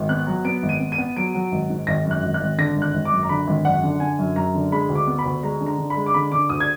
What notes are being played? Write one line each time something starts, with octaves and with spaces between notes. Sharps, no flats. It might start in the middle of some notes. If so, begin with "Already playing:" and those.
Already playing: G#1
B3 F#6
F#3
B3 D7
G#1
D#7
B3
D#7
B3
F#3 D7
F#3
G#1
G#2
G#1 A#6
F#2
F#6
G#1
F#6
G#1
D3 A#6
G#1
F#6
G#1
D6
F#2
A#5
D3 B5
G#1
F#2 F#5
D3
D3 G#5
F#2
F#2 A#5
D3
G#3 B5
D2
D6
B3
B5
D2
G#3 A#5
D3
A#5
D3
B5
G#3
D6
D3 B5
D3 D6
D2 D#6
G#6